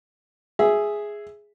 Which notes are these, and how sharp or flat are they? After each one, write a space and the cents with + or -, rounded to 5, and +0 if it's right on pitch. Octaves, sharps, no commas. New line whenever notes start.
G#4 +0 E5 +0